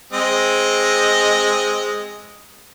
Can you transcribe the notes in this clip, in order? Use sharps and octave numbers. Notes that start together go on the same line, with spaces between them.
G#3 C4 D#5